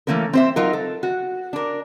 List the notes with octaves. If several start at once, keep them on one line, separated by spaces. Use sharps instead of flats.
E3 A3 A#3 C#4 A#4
C4 C5 E5
F#3 D#4 F4 A#4
A4
F#4
D4 A#4